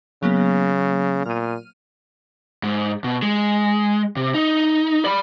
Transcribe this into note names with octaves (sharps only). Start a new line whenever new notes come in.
C#3 F#3 A#3 B3
A#2 F6 D#7
G#2
B2
G#3
C3
D#4
D5 B5